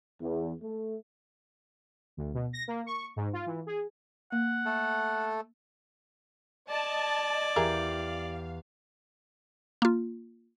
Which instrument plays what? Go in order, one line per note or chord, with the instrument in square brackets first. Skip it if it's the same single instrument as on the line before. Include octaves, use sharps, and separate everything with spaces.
[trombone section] E2
A3
[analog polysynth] D2
B2
A#6
A#3
C#6
G#2
F4
E3
G#4
[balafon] A#3 [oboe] F#5
[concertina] A3 A4
[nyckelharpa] D5 [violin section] D#5 A5 G#6
[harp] E2 G4 [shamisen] E4 G#4 A#4 [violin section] F5
[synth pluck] A#3 F4